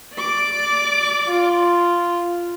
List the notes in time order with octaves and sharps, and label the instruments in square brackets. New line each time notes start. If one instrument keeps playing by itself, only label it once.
[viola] D5 D6
[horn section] F4